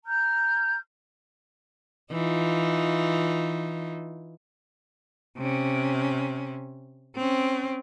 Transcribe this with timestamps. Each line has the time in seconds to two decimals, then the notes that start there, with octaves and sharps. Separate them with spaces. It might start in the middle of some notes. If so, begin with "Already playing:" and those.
0.05 A#5 F6 G6
2.12 E3 D#4 F4
5.38 C3 C#4
7.16 C4 C#4